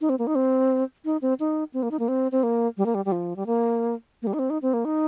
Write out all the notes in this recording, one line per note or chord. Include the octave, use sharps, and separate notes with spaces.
D#4
C4
A#3
D#4
C4
D#4
C4
D#4
C4
A#3
D#4
A#3
C4
C4
A#3
G3
A#3
G3
G3
F3
G3
A#3
A#3
G3
D#4
C4
D#4
C4
A#3
D#4